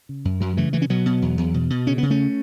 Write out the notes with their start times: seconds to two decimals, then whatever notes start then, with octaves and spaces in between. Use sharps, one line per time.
0.09 C#3
0.25 F#2
0.40 F#2 F#3
0.57 C#3 E3 A3
0.73 C#3 E3 A3
0.82 C#4
0.89 B2 F#3 B3
1.06 B2
1.22 E2
1.38 E2
1.54 B2
1.70 B2
1.87 C#3 C#4
1.98 C#3 B3
2.10 A3 C#4